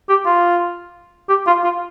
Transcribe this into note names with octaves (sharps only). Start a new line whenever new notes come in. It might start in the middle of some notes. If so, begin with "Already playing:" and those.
G4
F4
G4
F4
F4